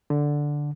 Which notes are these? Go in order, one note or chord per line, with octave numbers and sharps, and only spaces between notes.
D3